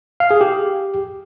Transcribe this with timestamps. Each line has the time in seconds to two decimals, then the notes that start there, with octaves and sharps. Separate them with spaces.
0.20 F5
0.31 G#4
0.41 G4